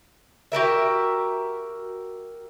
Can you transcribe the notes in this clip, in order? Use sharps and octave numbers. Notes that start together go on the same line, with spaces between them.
F#4 G4 A#4 E5